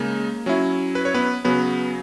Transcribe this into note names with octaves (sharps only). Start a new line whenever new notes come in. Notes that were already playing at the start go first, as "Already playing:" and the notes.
Already playing: C#3 G#3 A#3 D#4
F#3 C#4 E4
B4
C#5
B3 B4
C#3 F#3 B3 B4